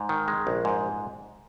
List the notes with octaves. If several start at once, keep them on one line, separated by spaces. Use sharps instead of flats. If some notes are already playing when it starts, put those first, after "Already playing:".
Already playing: G#2
D#3
G#3
A#1
G#2